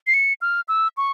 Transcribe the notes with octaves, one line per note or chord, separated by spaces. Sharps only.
C7
C#7
F6
E6
C#6